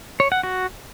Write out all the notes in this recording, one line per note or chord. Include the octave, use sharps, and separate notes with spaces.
C#5
F#5
F#4